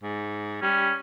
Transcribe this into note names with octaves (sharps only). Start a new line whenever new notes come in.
G#2
G3 C#4